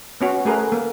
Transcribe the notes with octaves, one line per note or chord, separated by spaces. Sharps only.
B3 C#4 F#4
A3 G#4 A#4 B4
A#3